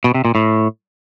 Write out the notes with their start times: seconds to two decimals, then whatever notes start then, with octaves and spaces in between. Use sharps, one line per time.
0.04 B2
0.14 C3
0.25 A#2
0.35 A2